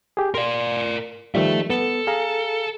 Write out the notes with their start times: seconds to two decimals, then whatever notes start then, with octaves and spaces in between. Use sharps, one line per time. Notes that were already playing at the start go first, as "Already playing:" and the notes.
0.17 G4 G#4
0.34 A#4 D5 C6
1.35 D#3 F3 G3 A4 E5
1.70 B3 A4
2.07 G#4 F5 A#5